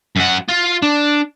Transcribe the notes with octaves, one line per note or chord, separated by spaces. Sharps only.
F#2 F#5
F4
D4